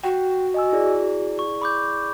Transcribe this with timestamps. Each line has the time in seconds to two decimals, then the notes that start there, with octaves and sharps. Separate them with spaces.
0.04 F#4 F#5 G5
0.54 D#5 G#5 E6
0.72 E4 G#4 D5
1.39 C#6
1.62 B5 D6 G6